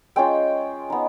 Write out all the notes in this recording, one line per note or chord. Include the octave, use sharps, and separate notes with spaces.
G#3 C#4 F4 G5
B3 D#4